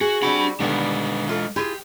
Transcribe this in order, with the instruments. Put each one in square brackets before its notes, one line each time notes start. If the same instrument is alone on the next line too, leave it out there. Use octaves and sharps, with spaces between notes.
[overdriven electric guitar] F#4 [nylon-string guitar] G#4
[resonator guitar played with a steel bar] G3 C4 F#4 [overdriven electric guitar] D4 B5
[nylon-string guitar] D3 [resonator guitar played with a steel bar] D#3 G3 B3 [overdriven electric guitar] G#3 D4
[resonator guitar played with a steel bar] E3 F4 A4
[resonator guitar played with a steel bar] E4 F4 G#4 [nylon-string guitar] G4